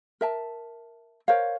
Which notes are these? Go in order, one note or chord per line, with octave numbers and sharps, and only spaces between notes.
A#4 E5 A5
A#4 C5 C#5 F5